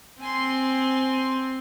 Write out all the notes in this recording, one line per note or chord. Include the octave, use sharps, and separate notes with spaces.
C4 G#5 C6